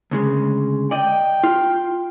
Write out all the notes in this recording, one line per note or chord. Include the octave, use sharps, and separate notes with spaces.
D2 C#3 G#3
D5 D#5 G5
F4